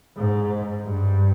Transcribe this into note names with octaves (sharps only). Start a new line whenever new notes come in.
G#2
G2